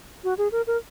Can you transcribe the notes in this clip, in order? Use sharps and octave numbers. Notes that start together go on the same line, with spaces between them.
F#4
G#4
A#4
A#4